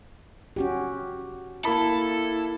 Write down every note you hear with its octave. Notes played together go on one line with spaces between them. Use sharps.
C#4 F#4 G4
A#3 E4 A4 B5